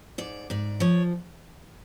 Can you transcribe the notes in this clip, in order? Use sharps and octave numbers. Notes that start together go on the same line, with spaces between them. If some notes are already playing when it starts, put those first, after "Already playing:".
G#2 D5
G#2 D5
F3 C#5